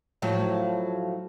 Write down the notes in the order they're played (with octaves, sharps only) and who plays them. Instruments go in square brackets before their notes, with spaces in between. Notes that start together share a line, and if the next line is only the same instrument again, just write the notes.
[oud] A2 F3 F#3